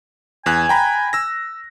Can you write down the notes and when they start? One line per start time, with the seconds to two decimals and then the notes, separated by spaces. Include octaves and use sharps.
0.46 E2 G#5 F#6
0.69 G5 A#5 B5
1.13 E6 A#6